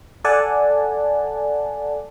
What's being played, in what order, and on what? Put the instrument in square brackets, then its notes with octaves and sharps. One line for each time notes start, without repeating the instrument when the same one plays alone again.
[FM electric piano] A4 D5 F#5 G#5 A5